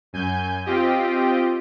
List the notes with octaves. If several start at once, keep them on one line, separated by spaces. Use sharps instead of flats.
F#2 G#5 G6
C4 F4 G4 D#5 G5